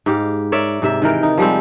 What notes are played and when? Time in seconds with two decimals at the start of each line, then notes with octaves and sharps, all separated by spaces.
0.06 G#2 G4 F5
0.52 A#4 C#5 D5 E5
0.82 G#2 C3 E5
1.02 D#3 E3 A#4 G5
1.23 D#4
1.38 F3 G3 G#3 C4